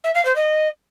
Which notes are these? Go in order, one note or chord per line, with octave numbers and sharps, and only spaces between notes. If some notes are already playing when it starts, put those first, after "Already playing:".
E5
F5
C5
D#5